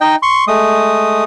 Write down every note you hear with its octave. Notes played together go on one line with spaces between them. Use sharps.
D#4 D#5 G5
C6 C#6
G#3 A3 D#6